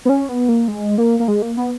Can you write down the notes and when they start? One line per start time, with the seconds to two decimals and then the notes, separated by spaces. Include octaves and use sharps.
0.05 B3
0.09 C#4
0.29 B3
0.49 A#3
0.68 G#3
0.98 A#3
1.20 A#3
1.28 G#3
1.42 A#3
1.57 B3